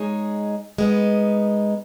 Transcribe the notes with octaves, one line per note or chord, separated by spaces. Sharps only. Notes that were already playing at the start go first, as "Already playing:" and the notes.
Already playing: G#3 D#4 G#4 C#5
G#3 B3 D#4